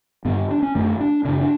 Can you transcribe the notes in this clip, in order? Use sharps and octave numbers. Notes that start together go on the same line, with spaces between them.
G2 D3 B3
D4
C#4
F#2 D3 A3
D4
F#2 C#3 D4
D4